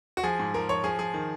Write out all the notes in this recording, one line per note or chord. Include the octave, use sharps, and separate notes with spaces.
F#4
F3 G#4
G#2
F3 A#4
F3 C#5
F3 G#4
F3 G#4
D#3